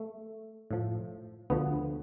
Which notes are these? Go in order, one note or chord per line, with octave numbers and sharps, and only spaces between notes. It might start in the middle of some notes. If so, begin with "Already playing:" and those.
Already playing: A3
A2 F3
D2 D3 F3 B3